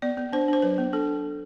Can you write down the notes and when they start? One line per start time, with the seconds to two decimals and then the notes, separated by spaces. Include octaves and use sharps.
0.02 B3 D5
0.17 B3
0.33 D4 C5
0.48 D4 C5
0.62 F#3 B4
0.78 B3
0.93 D4 A4